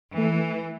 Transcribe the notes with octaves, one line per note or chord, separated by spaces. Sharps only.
E3 A3